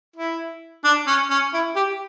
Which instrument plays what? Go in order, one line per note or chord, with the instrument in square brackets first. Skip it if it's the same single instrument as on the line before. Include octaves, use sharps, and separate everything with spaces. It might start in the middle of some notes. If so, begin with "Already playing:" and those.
[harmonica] E4
D4
C#4
C#4
E4
G4